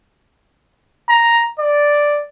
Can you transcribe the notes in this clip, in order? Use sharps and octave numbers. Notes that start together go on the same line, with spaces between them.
A#5
D5